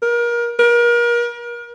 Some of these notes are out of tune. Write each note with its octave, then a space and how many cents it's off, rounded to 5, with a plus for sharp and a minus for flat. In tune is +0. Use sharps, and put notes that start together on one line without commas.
A#4 +30
A#4 +35